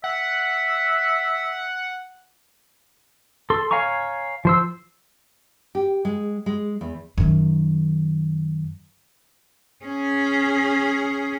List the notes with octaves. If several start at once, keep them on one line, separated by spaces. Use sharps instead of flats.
E5 F#5
A4 C6
C#5 F5 G#5 A#5 C#6
F3 C5 E6
G4
G#3
G#3
E2
F#2 D#3
C#4 G#4